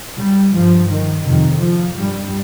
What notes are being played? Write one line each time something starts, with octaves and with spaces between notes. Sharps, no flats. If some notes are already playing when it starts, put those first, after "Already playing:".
G3
G2 F3
D#3
F2 C3 D#3
F3
G2 G3